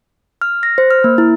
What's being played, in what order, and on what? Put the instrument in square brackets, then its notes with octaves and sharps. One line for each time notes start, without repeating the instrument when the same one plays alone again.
[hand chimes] F6
A#6
C5
F6
A#3
E4